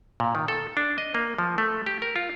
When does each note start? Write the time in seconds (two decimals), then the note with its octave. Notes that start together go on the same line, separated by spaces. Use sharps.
0.20 A#2
0.35 D#3
0.48 A4
0.77 D4
0.98 D#5
1.14 A#3
1.38 F3
1.58 A3
1.86 G4
2.02 A#4
2.16 F4